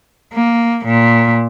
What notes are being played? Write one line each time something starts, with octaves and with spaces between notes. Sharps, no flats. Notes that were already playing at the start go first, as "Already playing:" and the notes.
A#3
A#2